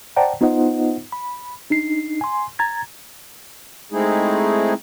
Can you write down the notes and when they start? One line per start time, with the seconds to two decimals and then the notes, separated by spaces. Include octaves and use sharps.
0.16 C5 D5 F#5 G5 A5 A#5
0.41 B3 D#4 F4 C5 D#5 F#5
1.12 B5
1.70 D4 D#4 C7
2.21 G#5 C6
2.59 A#5 G#6 A6
3.92 G#3 A3 C4 D#4 E4 G#4